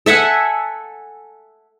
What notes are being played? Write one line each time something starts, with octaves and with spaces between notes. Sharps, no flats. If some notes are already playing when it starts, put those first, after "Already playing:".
A4 E5 F#5 G#5